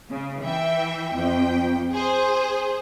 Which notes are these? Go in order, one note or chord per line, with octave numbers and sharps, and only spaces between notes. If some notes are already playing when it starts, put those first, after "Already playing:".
C#3
E3 E5 G5
F2 G5
G#4 C5